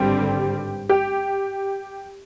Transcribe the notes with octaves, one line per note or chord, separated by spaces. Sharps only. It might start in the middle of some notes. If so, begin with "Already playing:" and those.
Already playing: G#1 G2 D3 G3 C4 G4
G4